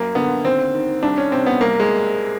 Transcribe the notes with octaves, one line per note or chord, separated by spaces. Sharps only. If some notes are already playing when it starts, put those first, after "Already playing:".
Already playing: F#2 A#3
D3 B3
D#2 C4
D#3
C2 D4
C#4
C3 C4
B3
C2 A#3
G#3